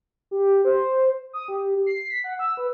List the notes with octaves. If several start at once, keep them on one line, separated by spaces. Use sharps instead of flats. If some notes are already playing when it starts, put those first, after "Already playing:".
G4
C5
D#6
G4
C7
B6
F#5
E6
B4